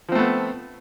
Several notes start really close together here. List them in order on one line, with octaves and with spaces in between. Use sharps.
F3 C4 A3 B3